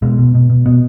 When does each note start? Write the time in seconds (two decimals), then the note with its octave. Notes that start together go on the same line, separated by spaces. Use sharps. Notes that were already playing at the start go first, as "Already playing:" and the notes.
0.02 B2 G#3
0.18 B2
0.35 B2
0.50 B2
0.66 B2 B3